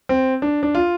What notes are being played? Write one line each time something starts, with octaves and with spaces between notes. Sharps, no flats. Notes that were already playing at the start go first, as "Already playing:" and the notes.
C4
D4
D4
F4